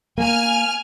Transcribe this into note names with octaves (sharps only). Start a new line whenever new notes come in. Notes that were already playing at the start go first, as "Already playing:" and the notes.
A#3 G#5 F6